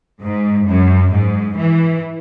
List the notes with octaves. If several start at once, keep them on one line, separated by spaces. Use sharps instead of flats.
G#2
F#2
G#2
E3